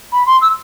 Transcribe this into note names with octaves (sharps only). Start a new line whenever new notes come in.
B5
C6
E6